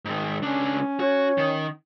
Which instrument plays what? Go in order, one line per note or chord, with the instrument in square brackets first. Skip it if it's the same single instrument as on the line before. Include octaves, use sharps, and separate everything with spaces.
[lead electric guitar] G#2 D#3
[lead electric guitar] C#2 D4 [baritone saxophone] C#4
[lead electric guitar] F#4 [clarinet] C#5
[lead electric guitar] D#3